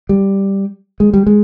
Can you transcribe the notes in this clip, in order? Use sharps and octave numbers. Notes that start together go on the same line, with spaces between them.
G3
G#3
G3
G#3